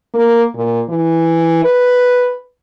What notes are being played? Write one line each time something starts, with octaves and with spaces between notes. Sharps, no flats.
A#3
A#2
E3
B4